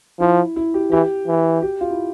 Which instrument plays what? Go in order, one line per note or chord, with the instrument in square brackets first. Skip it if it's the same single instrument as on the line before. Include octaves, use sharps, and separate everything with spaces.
[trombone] F3 [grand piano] E4
[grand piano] E4
G4
[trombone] E3 [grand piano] G4
[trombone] E3
[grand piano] G4
F4
E4